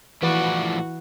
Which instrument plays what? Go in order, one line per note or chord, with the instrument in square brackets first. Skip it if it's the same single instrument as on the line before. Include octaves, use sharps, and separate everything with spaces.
[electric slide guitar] A2 F3 D5 [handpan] E3 B4 [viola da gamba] F#4